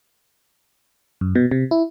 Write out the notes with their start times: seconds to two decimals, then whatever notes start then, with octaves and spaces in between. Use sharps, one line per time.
1.21 F#2
1.35 B2
1.51 C3
1.71 E4